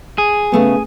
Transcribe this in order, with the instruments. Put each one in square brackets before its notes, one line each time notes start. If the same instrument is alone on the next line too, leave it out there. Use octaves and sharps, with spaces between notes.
[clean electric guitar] G#4
[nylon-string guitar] C#3 A3 B3